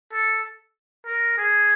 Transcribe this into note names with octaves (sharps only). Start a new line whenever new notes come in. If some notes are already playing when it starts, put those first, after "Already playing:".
A4
A#4
G#4